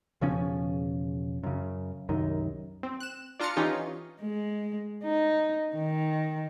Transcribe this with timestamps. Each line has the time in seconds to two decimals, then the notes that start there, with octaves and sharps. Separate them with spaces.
0.21 E1 C#3 F3 C#4
1.44 F#2 C#3
2.09 C2 F#2 D#3
2.83 C4
3.00 F#6 E7
3.39 D4 F4 A#5 F6 A6 C#7
3.56 E3 C#4 D#4 F4 G4
4.21 G#3
5.03 D#4
5.74 D#3